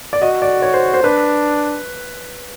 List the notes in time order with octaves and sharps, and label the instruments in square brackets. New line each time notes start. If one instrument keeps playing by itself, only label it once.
[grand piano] D5
[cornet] F#4 [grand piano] D#5
[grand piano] D5
C#5
C5
C5
[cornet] D4 [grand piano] B4